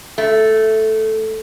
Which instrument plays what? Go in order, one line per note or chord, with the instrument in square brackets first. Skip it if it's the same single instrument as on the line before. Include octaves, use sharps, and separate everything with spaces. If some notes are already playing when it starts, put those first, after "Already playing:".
[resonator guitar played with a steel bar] A3